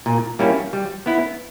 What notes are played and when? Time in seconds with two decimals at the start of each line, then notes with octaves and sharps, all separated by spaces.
0.06 A#2
0.39 G3 A#3 C#4 E4
0.73 G3
1.06 B3 E4